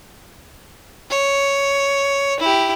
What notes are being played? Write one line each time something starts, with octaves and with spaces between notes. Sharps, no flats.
C#5
E4 G4